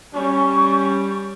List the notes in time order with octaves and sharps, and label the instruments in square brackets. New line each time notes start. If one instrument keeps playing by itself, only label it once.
[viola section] G3 [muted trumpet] C#4 [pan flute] C#6